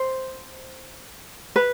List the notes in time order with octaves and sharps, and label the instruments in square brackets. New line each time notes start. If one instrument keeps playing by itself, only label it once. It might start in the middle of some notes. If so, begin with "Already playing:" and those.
Already playing: [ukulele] C5
B4